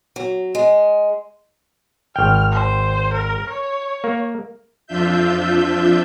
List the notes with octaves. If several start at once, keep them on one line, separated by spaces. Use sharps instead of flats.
F#3
G#3
G#1 G5 F6
C5
A#4
C#5
A#3
F2 F3 D4 F4 E5 G6